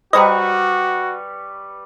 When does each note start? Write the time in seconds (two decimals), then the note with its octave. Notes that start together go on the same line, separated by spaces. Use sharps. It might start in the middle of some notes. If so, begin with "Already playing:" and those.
0.13 G3 F#4 B4 C5 D#5 G5 A#5 C#6